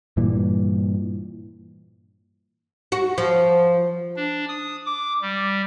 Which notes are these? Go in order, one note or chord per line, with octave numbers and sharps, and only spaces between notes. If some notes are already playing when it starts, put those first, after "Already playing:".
G2 A#2 E3
F#4
F3
D4
D#6
D6
G3